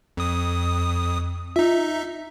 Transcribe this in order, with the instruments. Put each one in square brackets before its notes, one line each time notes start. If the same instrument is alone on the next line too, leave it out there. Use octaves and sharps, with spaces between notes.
[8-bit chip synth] F2 D#6
[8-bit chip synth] D#4 E5 [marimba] F4